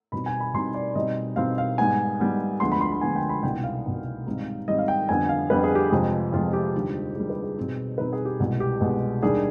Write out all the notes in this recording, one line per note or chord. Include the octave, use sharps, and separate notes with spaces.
B2 G3 C4 D#4 B5
G#5
B5
B2 G3 C4 D#4 C6
D5
B2 G3 C4 D#4 D#5
B2 G3 C4 D#4 F5
F5
G#2 G3 B3 G#5
G#2 G3 B3
D2 D3 F3 G#3 B3 C6
B5
C6
B5
D2 D3 F3 G#3 B3 G#5
G5
B5
C2 B2 B3 D#4 G5
F5
C2 B2 B3 D#4
G#2 D#3 G3 C4 D#4
G#2 D#3 G3 C4 D#4 D#5
F5
G5
F2 D3 G3 B3 G#5
F5
F2 D3 G3 B3 B4
G#4
G4
F2 C3 F3 G#3 G#4
F2 C3 F3 G#3 F4
G4
D#2 D3 G3
D#2 D3 G3 G#4
B4
G#4
B2 G3 C4 D#4
B2 G3 C4 D#4 B4
G#4
G4
C2 B2 G#3 B3
G4
C2 B2 G#3 B3
D#2 D#3 G3 D4 G#4